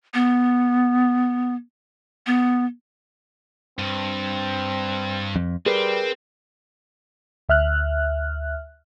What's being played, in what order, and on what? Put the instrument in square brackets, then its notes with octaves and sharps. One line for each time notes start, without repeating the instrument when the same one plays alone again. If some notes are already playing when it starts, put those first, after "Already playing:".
[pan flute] B3
B3
[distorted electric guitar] G2 [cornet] C4
[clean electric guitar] F2
[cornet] G3 [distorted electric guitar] C4 [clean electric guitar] G#4 A#4 B4
[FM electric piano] D2 E5 F6 F#6